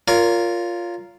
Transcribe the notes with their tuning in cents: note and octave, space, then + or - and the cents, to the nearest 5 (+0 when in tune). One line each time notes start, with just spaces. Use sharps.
F4 +0 A#4 -5 C#5 +35